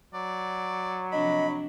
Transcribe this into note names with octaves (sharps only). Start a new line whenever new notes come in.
F#3 D5
C3 F3 D4 D#5 B5